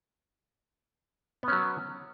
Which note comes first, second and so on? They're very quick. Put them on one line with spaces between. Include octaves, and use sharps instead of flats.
B3 C#4 F#3